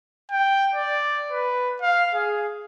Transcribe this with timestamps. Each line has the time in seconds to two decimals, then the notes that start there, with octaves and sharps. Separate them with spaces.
0.31 G5
0.75 D5
1.31 B4
1.82 F5
2.14 G#4